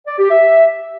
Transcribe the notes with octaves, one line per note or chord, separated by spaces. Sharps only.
D5
G4
E5